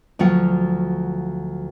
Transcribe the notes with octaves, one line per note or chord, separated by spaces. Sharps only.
D2 F3 F#3 F4 F#5